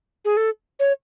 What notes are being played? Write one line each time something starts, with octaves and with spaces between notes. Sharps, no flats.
G#4
A4
C#5